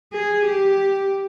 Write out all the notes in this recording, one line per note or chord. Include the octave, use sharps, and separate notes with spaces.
G#4
G4